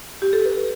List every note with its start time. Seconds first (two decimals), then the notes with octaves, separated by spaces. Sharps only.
0.22 G4
0.33 A4
0.45 B4